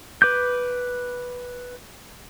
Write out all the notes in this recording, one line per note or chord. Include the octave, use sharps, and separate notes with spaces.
B4 D6 G6